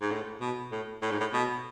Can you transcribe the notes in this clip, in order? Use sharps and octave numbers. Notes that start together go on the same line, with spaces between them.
G#2
A2
B2
A2
A2
G#2
A2
B2